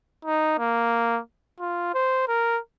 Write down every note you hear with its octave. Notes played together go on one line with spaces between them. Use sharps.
D#4
A#3
F4
C5
A#4